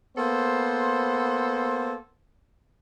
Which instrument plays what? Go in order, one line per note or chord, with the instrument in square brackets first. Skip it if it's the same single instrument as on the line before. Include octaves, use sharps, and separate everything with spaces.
[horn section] A#3 B3 A4 C5